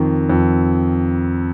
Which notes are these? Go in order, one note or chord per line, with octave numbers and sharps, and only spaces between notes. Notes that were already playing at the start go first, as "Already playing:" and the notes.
Already playing: F2 D#3
F2